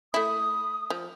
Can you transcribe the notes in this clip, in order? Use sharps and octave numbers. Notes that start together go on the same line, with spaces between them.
A3 E4 D#6
F3